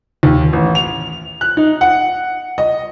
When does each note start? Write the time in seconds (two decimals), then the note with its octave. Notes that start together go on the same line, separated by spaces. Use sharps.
0.23 D#2
0.53 A1
0.75 F7
1.41 F#6
1.57 D#4
1.81 F#5
2.58 D#5